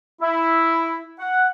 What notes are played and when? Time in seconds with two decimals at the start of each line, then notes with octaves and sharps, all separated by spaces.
0.21 E4
1.19 F#5